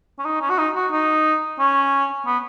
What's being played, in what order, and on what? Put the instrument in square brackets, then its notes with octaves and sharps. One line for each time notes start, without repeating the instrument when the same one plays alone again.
[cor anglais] C#4
D#4
C#4
F#4
D#4
F#4
D#4
C#4
B3